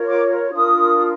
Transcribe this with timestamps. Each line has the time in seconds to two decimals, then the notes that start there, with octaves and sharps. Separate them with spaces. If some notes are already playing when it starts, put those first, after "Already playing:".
Already playing: F4 A#4 C#5
0.09 D6
0.52 D4 F4 A#4 D#6